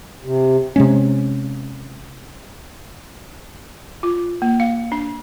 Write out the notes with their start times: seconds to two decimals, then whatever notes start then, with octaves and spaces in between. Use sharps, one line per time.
0.24 C3
0.76 C3 G#3 C#4
4.03 F4
4.42 A#3
4.60 F5
4.92 D4